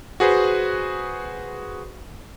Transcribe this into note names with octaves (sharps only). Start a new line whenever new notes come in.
F#4 G#4 B4 C5